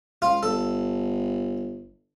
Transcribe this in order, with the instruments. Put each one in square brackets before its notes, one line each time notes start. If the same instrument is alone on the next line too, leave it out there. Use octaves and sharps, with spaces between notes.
[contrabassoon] C#2 [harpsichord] F4
[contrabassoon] G1 [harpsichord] A4